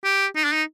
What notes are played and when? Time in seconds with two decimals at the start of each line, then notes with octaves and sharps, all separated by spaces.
0.04 G4
0.36 D#4
0.44 D4
0.53 D#4